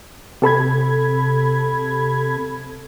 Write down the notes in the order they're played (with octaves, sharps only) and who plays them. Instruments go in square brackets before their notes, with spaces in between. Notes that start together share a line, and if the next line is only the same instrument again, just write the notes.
[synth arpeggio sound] C3 A4 B5 G#6